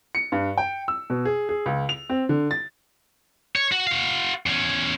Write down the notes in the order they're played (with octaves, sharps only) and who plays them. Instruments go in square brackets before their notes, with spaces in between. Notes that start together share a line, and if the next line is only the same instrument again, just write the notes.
[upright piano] C#7
G2
G5
E6
B2
G#4
G#4
C#2
F7
C4
D3
A6
[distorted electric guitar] C#5
F#4
F#4 F5
E2 C#4